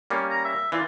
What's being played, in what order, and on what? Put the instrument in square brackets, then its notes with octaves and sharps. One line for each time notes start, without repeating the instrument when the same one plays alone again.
[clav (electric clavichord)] G3 A#3 C#4
[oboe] A#5
E5
[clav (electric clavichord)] E3 F4 [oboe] D5